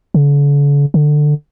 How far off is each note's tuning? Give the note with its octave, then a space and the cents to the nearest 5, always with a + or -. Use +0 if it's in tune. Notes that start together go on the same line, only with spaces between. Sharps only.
D3 -45
D3 +15